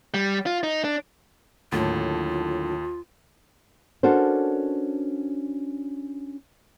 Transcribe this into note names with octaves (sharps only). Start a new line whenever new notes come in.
G3
F4
D#4
D4
D#2 A2 D3 F#3 F4
C#4 D4 F#4 A4 A#4 C5